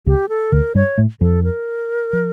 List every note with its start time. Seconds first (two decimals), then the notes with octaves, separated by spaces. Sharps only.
0.06 C#2 C#3 G4
0.29 A4
0.52 D2 D3 A#4
0.75 G2 G3 C#5
0.98 A2 A3
1.21 F2 F3 A4
1.44 A#4
2.13 F3